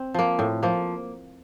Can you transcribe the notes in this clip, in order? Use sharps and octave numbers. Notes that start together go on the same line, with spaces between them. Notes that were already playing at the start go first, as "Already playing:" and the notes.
Already playing: C4
F3 A#3
A2
F3 A#3